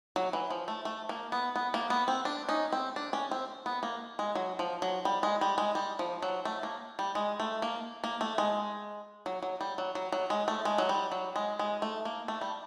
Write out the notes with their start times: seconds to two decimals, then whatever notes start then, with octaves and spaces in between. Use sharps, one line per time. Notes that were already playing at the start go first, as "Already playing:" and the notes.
0.16 F#3
0.33 E3
0.50 F3
0.68 A3
0.85 A3
1.09 A#3
1.32 B3
1.56 B3
1.74 A#3
1.90 B3
2.08 C4
2.25 D4
2.49 C#4 D#4
2.72 C4
2.96 D4
3.13 C#4
3.31 C4
3.66 B3
3.83 A#3
4.19 G#3
4.35 F#3
4.59 F3
4.82 F#3
5.05 G3
5.23 G#3
5.41 G3
5.58 G#3
5.75 G3
5.99 F3
6.22 F#3
6.45 A3
6.63 A#3
6.99 G3
7.15 G#3
7.40 A3
7.62 A#3
8.04 A#3
8.21 A3
8.38 G#3
9.26 F#3
9.42 F#3
9.61 G3
9.78 F#3
9.95 F#3
10.12 F#3
10.30 G#3
10.48 A3
10.65 G#3
10.78 F#3
10.89 G3
11.12 F#3
11.36 G#3
11.59 G#3
11.82 A3
12.05 A#3
12.28 A3
12.41 G3